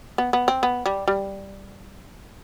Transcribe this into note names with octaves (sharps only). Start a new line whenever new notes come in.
B3
B3
C4
B3
G3
G3